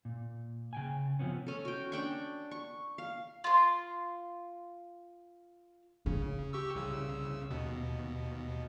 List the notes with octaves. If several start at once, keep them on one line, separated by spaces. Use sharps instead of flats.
A#2
C#3 G5 G#5
C3 F3 B3 C#4
C#4 A4
F#4 G5
D4 G5 C#6
C#6
F5
F4 C6
C#3 C#4
G4 C#6 E6
C2 C#3 E6
D#2 B2